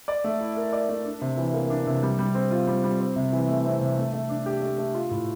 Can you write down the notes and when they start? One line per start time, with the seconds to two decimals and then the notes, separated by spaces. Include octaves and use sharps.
0.08 D5
0.24 A3
0.40 E4
0.57 A#4
0.73 D5
0.89 A3
1.05 D4
1.21 C3
1.37 E3
1.54 A#3
1.70 D4
1.87 C3
2.03 G3
2.19 G3
2.35 C4
2.51 F4
2.67 G3
2.84 G3
3.00 C4
3.16 C3
3.32 E3
3.48 A3
3.65 C4
3.81 C3
3.97 A3
4.13 A3
4.29 D4
4.46 G4
4.62 A3
4.78 A3
4.94 F4
5.11 A2